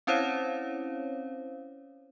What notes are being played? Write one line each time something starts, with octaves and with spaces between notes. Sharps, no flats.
C4 C#4 E4 C5 C#5 F5